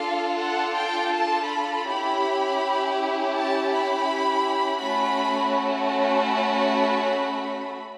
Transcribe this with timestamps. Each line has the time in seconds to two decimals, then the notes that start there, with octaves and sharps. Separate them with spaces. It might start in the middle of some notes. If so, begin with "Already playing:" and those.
Already playing: D4 F4 A4 F5
0.41 F#5
0.77 G5
1.14 A5
1.51 B5
1.87 C#4 E4 G4
3.34 A5
3.71 B5
4.80 A3 C#4 F#4 B5
5.54 B5